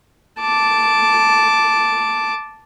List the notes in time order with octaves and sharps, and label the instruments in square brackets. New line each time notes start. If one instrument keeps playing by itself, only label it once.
[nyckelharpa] A5 D6